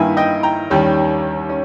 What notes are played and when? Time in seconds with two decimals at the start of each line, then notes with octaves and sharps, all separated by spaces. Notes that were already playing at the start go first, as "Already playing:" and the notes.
Already playing: G2 D#3 A#3 E4 E5 G#5
0.17 D#5 G5
0.43 G5 A#5
0.70 D#2 D#3 G3 C#4
1.49 C#4